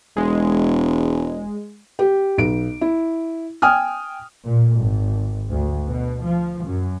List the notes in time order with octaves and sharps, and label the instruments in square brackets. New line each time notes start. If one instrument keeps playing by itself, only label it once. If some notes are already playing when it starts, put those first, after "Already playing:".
[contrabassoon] E1 [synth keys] G#3
[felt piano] G4
B1 D7
E4
G5 G#5 D#6 F6
[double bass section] A#2
G#1
D2
B2
F3
F#2